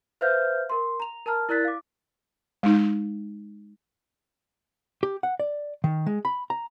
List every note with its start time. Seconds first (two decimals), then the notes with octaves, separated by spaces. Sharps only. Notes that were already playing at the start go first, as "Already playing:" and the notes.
0.21 B4 C5 E5 F5 F6 G6
0.70 A#4 C6
1.00 A#5 F7
1.26 A#4 A5 A#5 F6
1.49 E4 A#4 D5 F#6 A6 B6
1.65 F5 D6
2.63 G#3 D#4
5.03 G4
5.23 F#5
5.40 D5
5.84 D#3
6.06 G#3
6.25 B5
6.50 A#5